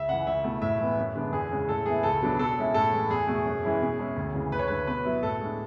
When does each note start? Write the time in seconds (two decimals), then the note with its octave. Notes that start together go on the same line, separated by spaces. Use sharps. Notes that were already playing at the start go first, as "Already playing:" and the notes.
Already playing: C#2 E5
0.08 C#3 E3 F#5
0.26 C#2 E5
0.44 B2 A3 E4
0.61 A2 E5
0.80 E3 B3
0.98 F#2
1.15 D3 G#3 B3 D4
1.32 E2 G#4
1.51 C#3 G#3 C#4
1.69 A2 A4
1.86 E3 B3 E4 G#4
2.03 C#2 A4
2.22 B2 F#3 B3 D4
2.39 B2 A4
2.57 G#3 C#4 E4
2.74 A2 A4
2.92 E3 G#3 B3
3.10 E2 G#4
3.27 B2 A3
3.46 F#2
3.63 E3 G#3 C#4 E4
3.81 B2
3.99 G#3 C#4 E4
4.16 D2
4.35 C#3 E3
4.52 D2 B4
4.59 C#5
4.67 D3 A3 B4
4.87 B2 B4
5.05 F#3 B3 E4
5.23 A2 A4
5.40 G#3
5.45 D4